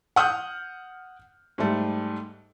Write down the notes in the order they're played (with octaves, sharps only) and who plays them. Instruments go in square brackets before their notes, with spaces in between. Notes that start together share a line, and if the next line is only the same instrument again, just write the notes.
[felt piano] F#5 D#6 F6 G6
G#2 G3 A3